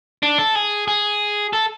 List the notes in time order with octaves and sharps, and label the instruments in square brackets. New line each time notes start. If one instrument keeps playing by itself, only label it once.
[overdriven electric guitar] D4
A4
G#4
G#4
A4